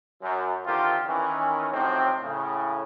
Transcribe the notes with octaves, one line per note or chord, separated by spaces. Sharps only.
F#2
D3 D#3 C4 F4 G4 A#4
D#3 E3 C#4
F2 A2 C3 F#3 C4 D#4
A2 C#3